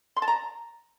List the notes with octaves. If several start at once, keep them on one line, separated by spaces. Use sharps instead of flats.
C6
A5
A#5